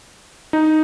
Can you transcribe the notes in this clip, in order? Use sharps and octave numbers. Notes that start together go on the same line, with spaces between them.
D#4